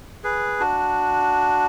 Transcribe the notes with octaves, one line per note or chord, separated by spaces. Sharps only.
G#4 B4
D4 F#4